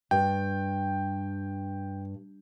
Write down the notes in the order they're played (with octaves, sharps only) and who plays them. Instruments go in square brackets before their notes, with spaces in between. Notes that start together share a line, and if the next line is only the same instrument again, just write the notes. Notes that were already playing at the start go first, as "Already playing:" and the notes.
[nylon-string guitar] G2 [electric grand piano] G5